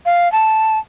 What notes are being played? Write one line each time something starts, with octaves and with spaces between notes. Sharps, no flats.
F5
A5